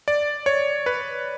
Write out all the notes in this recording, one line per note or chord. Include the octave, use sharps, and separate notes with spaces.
D5
C#5
B4